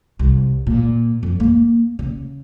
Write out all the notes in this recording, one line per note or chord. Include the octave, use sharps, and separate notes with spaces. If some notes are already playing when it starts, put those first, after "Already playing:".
C2
A#2
F2
A#3
C#3